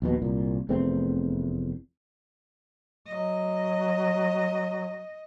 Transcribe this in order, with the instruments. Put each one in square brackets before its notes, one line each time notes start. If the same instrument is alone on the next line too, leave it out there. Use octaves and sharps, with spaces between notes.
[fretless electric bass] A#1 D#2 B2
C2 A#2
F1 E2 A3 C4
[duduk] F#3 [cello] D#5